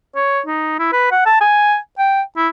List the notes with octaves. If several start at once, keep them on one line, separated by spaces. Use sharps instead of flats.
C#5
D#4
E4
B4
F#5
A5
G#5
G5
E4